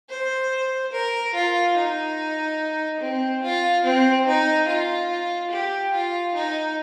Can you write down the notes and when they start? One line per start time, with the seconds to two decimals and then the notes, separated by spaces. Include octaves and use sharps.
0.09 C5
0.92 A#4
1.34 F4
1.76 D#4
3.00 C4
3.43 F4
3.84 C4
4.26 D#4
4.68 F4
5.51 G4
5.93 F4
6.35 D#4